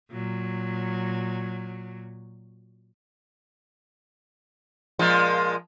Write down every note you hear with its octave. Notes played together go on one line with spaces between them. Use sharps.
A#2 F#3
A#2 F3 G#3